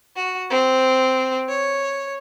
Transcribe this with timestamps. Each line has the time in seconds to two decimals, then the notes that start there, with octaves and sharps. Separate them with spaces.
0.16 F#4
0.50 C4
1.49 C#5